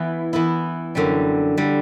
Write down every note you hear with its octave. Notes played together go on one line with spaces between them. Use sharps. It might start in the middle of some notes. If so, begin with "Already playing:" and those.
Already playing: E3 B3 E4
E3 B3 E4
F#2 D3 G3
D3 G3